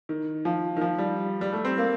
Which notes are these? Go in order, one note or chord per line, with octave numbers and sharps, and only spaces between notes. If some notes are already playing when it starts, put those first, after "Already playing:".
D#3
F3
D#3
F3
G3
G3
A3
C4
A#3